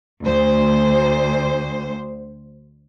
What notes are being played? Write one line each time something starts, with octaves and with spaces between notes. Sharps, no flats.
D2 C5